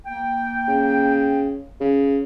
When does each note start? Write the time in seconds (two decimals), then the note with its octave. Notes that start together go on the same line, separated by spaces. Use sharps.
0.06 A#3 G5
0.68 C#3
1.81 C#3